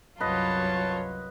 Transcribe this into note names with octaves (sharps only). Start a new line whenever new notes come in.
C2 F#2 F#3 F4 B4 C#5 D#5 A5